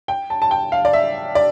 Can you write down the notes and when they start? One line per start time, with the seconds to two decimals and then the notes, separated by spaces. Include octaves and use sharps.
0.08 G5
0.30 A5
0.42 A5
0.51 G5
0.72 F5
0.85 D5
0.93 E5
1.35 D5